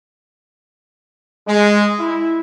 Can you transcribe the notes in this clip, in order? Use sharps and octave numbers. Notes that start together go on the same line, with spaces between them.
G#3
E4